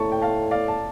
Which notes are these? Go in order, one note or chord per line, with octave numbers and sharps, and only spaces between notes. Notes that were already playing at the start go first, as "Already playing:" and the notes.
Already playing: A2 A5 C#6
G5
F5 A5
D5 F5
A5